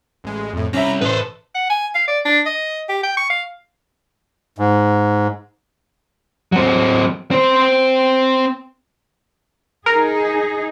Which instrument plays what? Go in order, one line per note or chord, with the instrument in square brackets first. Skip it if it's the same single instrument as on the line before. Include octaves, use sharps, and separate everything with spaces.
[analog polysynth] A1 G#3
F2 A2
[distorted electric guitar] C2 G4 [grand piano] C#4 E5 [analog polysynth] A#5 B5
[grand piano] A1 [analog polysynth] A2 [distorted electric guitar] A4 [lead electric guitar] B4 C5
[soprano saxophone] F#5
G#5
F5
D5
D4
D#5
G4
G5
C#6
F5
[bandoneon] G#2
[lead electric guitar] F#3 C4
C4 C5
[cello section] D#4 G#4 [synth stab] A#4